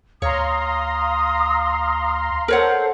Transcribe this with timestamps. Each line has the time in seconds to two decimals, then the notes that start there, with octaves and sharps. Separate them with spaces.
0.22 D2 C#5 F5 A#5 C6 D#6
2.48 A4 A#4 C5 C#5 F#5